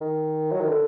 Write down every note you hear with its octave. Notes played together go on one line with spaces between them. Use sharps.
D#3
F#3
D#3
D3